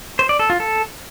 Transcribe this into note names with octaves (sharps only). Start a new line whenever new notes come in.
C5
D5
A4
F4
A4